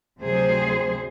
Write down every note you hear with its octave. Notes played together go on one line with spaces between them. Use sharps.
D2 C3 F#3 G#4 C5